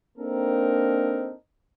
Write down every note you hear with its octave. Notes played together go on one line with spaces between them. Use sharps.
A#3 C4 D4 D#4 A4 A#4